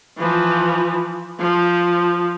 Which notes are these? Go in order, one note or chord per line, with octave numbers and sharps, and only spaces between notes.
E3 F3
F3